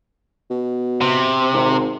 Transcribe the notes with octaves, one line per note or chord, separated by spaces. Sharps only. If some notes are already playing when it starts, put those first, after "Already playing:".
B2
C3
G#1